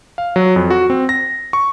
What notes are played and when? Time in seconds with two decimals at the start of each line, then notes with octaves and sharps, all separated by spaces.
0.18 F5
0.36 F#3
0.56 F2
0.70 F#4
0.90 C4
1.09 A#6
1.53 C#6